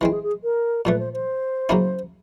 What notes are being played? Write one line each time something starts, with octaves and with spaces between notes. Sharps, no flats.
E3 G#3 C4 E4
G#4
G#4
A#4
A#2 F3 A3 B4
C5
C5
C#3 F#3 A#3 C#4 E4